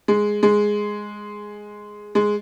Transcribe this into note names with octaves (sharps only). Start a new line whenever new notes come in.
G#3
G#3
G#3